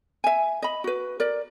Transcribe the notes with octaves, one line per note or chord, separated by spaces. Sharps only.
E5 G#5
D#5 B5
F#4 B4
A#4 D5